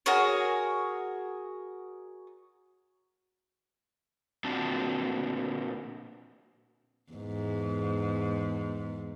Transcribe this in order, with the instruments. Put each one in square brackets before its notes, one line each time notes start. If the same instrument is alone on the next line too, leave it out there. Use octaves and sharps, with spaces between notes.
[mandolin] F#4 G#4 A#4 C#5
[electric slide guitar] A#2 C4 D4 F#4 A5
[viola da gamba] E2 G#2